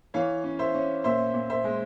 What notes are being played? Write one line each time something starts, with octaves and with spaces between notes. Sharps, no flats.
E3 C#5 F5
C#4
C5 E5
C#4
A#2 C5 E5
A#2
C5 E5
G#3